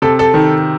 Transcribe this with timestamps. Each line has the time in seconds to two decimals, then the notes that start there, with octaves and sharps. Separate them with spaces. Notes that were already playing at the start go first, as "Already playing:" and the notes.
0.02 C3 A4
0.19 A4
0.34 D#3